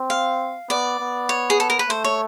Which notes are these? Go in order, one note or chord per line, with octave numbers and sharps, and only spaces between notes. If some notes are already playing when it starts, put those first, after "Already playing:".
Already playing: C4
F5
B3 D5
B3
C#5
G#4
A4
A#4
B4
A3 C5
C#5